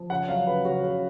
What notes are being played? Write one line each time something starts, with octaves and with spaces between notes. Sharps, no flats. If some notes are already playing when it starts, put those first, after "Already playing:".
Already playing: F3
C#3 F#5
F#3 F5
C#3 B4
C#3 F#4
C#3